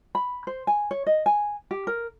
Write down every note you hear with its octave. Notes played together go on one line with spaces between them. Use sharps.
B5
C5
G#5
C#5
D#5
G#5
G4
A#4